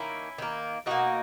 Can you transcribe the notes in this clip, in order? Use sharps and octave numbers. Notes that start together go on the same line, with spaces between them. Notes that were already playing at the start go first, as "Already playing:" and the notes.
Already playing: D#3 A#3 C#4 E4
D#3 A#3
B2 A#3 D#4 F#4